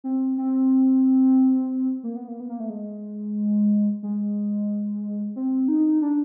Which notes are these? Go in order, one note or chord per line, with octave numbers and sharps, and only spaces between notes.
C4
C4
A#3
B3
A#3
B3
A#3
A3
G#3
G#3
C4
D#4
D4